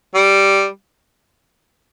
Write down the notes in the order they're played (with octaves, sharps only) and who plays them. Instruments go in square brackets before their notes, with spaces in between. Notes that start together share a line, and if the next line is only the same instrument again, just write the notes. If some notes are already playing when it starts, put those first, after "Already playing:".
[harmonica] G3